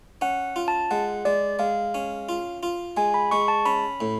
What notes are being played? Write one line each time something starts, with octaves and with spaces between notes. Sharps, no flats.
C#4 F#5
F4
A5
G#3 F#5
G#3 D5
G#3 F5
C#4
F4
F4
G#3 G#5
B5
G#3 C#6
A5
C#4 B5
A2